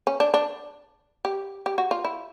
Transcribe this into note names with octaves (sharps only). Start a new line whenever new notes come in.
C#4
D4
D4
G4
G4
F#4
F4
E4